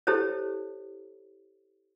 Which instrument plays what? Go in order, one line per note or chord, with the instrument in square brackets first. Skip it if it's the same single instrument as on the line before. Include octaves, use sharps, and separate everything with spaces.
[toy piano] E4 G4 A4 C5 C#5